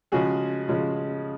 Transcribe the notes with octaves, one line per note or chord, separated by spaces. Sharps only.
C#3 F3 G#3 F#4 G#4
C#3 F3 G#3